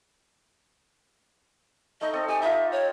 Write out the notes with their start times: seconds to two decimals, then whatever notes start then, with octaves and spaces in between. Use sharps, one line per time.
2.01 A3 D#4 D#5
2.13 C4 A4 D#6
2.28 G4 G#5
2.42 D#4 F4 E5
2.72 C#5